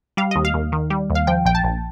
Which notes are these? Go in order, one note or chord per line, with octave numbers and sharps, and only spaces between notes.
G3 F5
D#2 D#5
F5
D#2
D#3
G3
D#2
F5
F3 G5
A#1 G5
A5
A#1